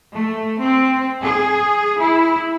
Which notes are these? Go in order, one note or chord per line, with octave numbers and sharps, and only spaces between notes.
A3
C4
G#4
E4